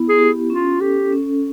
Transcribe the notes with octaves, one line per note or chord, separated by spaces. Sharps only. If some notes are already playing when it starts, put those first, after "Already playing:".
Already playing: B3 E4
G#4
G4
C#4 F4
G4 A4
C#4